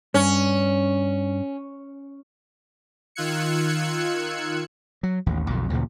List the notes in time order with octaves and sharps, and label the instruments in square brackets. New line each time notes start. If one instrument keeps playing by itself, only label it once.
[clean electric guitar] G2 [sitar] C#4
[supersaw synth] D#3 F4 E6 F#6 G#6 C#7
[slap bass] F#3
A1 D#2
B1 F2 B2 D3
D2 A#2 C#3 E3